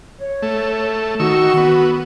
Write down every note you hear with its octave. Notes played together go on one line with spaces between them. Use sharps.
C#5
A3
D#3 F#4 C#6 E6
B3